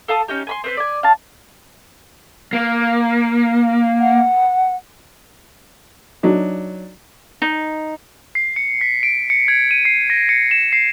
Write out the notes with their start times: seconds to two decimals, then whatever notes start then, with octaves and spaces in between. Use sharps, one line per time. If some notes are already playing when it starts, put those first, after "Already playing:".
0.08 A4 F5 A5 D#6
0.28 C#4 D#4 G4
0.47 G#5 B5 C6
0.64 C4 B4 C5
0.77 D5 G#5
1.03 F5 A5
2.53 A#3
4.00 F#5
6.23 F#3 D4 D#4
7.42 D#4
8.35 C7
8.56 C#7
8.81 B6
9.03 D7
9.30 C#7
9.48 G#6
9.71 D#7
9.85 C7
10.10 A#6
10.29 C#7
10.51 E7
10.73 C7